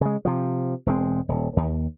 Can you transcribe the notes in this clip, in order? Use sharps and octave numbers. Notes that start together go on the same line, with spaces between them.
C#3 G#3
C3 F3
E1 G#3 C4
D#1
D#2